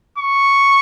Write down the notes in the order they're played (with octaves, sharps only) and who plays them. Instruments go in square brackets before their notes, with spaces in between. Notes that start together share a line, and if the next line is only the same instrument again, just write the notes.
[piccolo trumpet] C#6